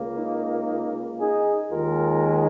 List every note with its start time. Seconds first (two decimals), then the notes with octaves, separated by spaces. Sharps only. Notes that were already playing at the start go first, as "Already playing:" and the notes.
Already playing: C#2 C#3 A#3
0.17 D#4
1.20 D#4 G#4
1.71 D#2 D#3 G#3 F4 A#4